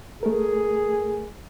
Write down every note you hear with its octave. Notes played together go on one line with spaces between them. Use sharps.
A3 G#4 A#4